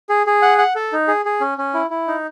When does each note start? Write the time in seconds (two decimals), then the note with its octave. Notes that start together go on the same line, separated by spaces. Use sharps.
0.09 G#4
0.27 G#4
0.42 F#5
0.58 F#5
0.76 A4
0.92 D#4
1.08 G#4
1.25 G#4
1.41 C#4
1.58 C#4
1.74 E4
1.90 E4
2.08 D#4